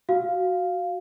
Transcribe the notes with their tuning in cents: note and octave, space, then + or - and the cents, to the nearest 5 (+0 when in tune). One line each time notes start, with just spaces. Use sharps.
F#4 +0 F5 +0